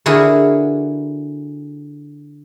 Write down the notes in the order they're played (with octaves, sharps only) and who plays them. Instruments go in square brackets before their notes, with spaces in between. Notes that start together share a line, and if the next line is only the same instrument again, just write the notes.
[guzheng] D3 E4 F#4 G#4 A#4